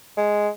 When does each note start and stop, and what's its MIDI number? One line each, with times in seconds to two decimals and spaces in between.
0.17 0.49 56